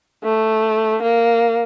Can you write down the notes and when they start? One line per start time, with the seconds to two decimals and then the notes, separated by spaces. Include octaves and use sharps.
0.24 A3
1.02 A#3